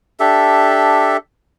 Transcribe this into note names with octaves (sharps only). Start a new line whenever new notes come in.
D4 G4 A4 E5